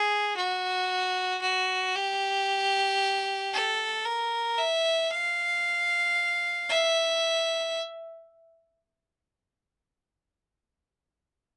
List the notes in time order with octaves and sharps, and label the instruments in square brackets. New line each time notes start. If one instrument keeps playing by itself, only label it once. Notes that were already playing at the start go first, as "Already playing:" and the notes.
Already playing: [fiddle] G#4
F#4
F#4
G4
A4
A#4
E5
F5
E5